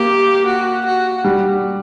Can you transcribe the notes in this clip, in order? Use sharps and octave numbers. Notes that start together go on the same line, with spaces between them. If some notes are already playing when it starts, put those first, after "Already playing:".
Already playing: A#3 G4
F#4
F#4
G3